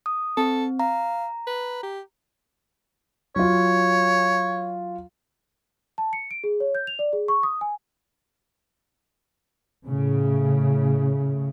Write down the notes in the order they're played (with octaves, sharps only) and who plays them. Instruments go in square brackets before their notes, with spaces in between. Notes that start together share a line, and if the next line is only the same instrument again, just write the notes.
[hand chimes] D#6
[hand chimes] C4 [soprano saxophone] A4
[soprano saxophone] F5 [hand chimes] A#5
[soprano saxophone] B4
G4
[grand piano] F#3 F4 [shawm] C#5
[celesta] A5
C#7
D7
G#4
C#5
G6
F7
D5
G#4
C#6
D#6
G#5
[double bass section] A2 C#3